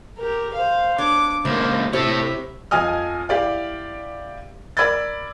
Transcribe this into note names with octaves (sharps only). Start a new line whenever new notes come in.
G4 A#4
C5 F5
D4 C#5 D6
C#2 A#3 C5 E5
C3 E4 A4 C#5 E5
F2 F3 D#5 G#5 D#6 F6
E4 G4 D5 F5
A#4 D5 B5 E6 G#6 A6